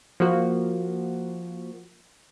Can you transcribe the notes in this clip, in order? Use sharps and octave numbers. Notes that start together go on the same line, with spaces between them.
F3 A#3 F#4